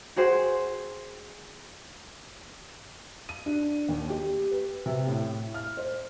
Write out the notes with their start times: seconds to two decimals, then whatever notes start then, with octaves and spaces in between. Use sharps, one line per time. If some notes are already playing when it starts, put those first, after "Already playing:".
0.16 F#4 G#4 C5 G5
3.29 D#7
3.46 D4
3.89 D#2
4.10 G4
4.51 B4
4.86 C3
5.08 A2
5.54 F6
5.77 C5